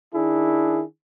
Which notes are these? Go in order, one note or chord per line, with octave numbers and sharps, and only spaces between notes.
D#3 D4 E4 G#4